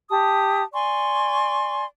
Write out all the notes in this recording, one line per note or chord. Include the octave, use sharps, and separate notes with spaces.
G4 A5 D#6
D5 G#5 C6 C#6